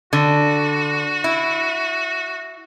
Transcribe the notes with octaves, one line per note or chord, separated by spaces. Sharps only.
D3 F#4
E4